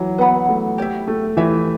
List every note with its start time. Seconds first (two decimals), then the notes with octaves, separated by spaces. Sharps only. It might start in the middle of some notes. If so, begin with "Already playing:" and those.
Already playing: E3 F#3
0.18 B3 B4 F#5 B5
0.48 A3
0.78 G4 C#5 E5
1.07 A3
1.37 E3 G4 C#5 E5